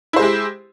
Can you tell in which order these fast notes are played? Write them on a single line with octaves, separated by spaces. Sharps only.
E4 C5 G#3 G4